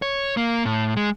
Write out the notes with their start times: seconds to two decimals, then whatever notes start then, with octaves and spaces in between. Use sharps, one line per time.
0.02 C#5
0.37 A#3
0.66 A2
0.97 G#3